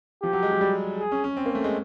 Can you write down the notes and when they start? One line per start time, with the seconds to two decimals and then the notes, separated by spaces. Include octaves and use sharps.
0.23 F3 G4
0.33 F#3
0.43 G#3
0.52 F#3
0.61 G3
0.99 G#4
1.12 C#4
1.24 C#4
1.37 C4
1.46 A#3
1.55 A3
1.64 G#3